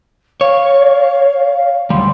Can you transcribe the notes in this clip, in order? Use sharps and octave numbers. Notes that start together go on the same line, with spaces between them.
C#5 F5
D2 G3 C6